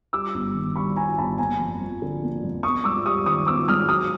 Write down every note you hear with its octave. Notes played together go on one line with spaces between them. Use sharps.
G3 D6 E6
G1
D#3
G2 B5 C#6
G3 G#5 A#5
G1 A5 B5
A#3 G#5 A#5
F2
F3
D3
A#3
F2
B3 C#6 D#6
G#2 D6 E6
G3 C#6 D#6
D#3 C#6 D#6
B3 D6 E6
G#2 D#6 F6
F#3 D#6 F6